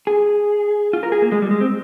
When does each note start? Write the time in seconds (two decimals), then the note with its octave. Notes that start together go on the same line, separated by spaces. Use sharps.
0.07 G#4
0.93 F4
1.03 A#4
1.12 G#4
1.22 A#3
1.32 G#3
1.42 G3
1.51 G#3
1.61 C4